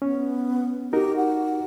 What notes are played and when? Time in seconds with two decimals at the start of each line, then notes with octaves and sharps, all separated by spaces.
0.02 B3 C#4
0.93 D#4 F#4 G4 A#4
1.17 F#5